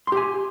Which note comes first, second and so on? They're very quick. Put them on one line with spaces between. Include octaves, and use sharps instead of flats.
C6 G4 G#5